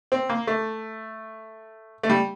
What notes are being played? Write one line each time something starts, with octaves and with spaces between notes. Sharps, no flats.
C4
A#3
A3
A3
G3